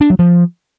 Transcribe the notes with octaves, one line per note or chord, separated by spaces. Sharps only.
D4
F#3
F3